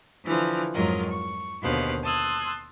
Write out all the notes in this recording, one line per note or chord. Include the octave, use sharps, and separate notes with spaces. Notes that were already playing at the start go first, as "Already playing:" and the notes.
D3 E3 F3
F2 G#2 F#3 F4 A#4 D#5
C#6
D#2 B2 D3 C5 F5 F#6
A5 C6 D#6 E6 F#6 G#6